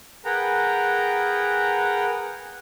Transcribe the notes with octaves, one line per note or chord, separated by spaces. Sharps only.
G#4 A#4 B4 F#5 G5 A#5